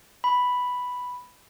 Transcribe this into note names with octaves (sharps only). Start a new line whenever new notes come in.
B5